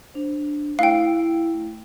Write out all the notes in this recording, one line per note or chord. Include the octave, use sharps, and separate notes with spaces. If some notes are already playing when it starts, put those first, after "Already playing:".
D4 C5
A3 E4 F5 G5